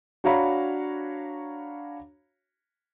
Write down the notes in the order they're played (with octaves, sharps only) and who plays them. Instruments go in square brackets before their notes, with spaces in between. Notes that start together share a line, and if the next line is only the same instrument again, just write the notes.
[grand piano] D4 F#4 C#5 F5 A#5 B5